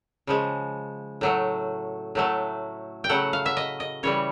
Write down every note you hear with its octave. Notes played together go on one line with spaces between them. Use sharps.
C#3 F3 G#3
A2 F#3 A3
A2 F#3 A3
G5
C#3 F#3 A3 F#5
F5
E5
D#5
D#5
C#3 E3 G3 C#5